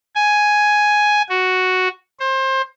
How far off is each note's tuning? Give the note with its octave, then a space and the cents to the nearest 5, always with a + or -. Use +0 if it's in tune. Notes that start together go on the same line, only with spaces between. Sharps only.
G#5 +5
F#4 +0
C5 +25